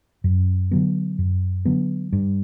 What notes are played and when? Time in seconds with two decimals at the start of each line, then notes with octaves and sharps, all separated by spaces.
0.24 F#2
0.71 D3 F#3 B3
1.18 F#2
1.65 D3 F#3 B3
2.13 G2